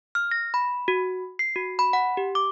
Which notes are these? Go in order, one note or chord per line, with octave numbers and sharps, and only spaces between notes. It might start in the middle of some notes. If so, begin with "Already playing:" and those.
F6
A#6
B5
F#4
C7
F#4
B5
F#5
G4
D6